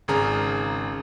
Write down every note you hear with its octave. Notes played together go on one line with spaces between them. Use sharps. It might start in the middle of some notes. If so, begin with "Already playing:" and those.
G#1 C#3 G#4 A#5